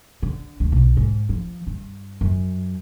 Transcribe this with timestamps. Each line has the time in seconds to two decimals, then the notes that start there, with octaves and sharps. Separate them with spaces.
0.23 D3
0.60 D2
0.72 B1
0.97 G#2
1.29 F3
1.67 G2
2.21 F#2